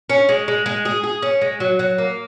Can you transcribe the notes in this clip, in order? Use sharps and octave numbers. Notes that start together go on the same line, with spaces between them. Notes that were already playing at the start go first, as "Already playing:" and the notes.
C#4
G#3
G#3
G#3
G#4
G#4
C#4
G#3
F#3
F#3
A#3